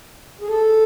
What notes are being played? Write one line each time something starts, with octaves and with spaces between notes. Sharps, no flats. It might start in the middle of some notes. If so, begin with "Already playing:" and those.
G#4
A4